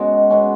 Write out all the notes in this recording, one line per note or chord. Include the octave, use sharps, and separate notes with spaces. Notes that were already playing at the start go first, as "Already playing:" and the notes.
Already playing: B2 G#3 C#4 F#4
B2 G#3 C#4